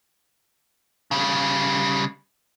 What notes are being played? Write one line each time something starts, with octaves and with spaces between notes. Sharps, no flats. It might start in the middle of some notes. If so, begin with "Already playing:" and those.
C#3 G3